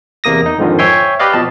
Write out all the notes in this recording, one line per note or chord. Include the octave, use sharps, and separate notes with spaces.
E2 C3 A#3 D#6 A#6
D#4
F2 G#2 D3 D#3 F3
C5 C#5 E5 G5 G#5 C6
G4 B4 D5 D#5 F5
B2 F3 A5